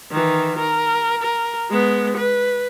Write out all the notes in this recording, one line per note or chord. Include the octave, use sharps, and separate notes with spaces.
D#3 E3
A#4
A#4
G#3 B3
B4